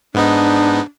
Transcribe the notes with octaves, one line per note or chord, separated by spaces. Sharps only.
G#2 B3 D4 D#4